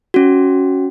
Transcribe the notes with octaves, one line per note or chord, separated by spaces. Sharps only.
C#4 F#4